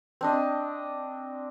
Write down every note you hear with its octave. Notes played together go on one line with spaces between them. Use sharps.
C4 D4 D#5